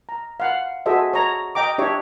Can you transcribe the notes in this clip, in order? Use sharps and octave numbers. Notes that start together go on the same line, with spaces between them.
A#5
F5 F#5
F#4 G#4 A4 C5 D#5 E5
C#5 A#5
D#5 G5 A#5 D6
D4 G4 C#5 E5